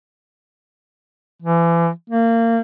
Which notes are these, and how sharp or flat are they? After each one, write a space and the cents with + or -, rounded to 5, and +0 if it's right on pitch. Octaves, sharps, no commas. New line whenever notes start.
E3 +35
A#3 -25